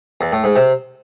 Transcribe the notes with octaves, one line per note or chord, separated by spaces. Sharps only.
E2
A2
G#2
C3